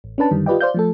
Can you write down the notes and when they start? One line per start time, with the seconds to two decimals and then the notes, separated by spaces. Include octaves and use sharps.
0.04 A1
0.18 C#4 D4 B4 A5
0.31 F#2 D3 D#3 G3
0.46 F4 G4 B4 D5 D#5 G5
0.61 C5 D5 F5 G6
0.74 F3 A3 A4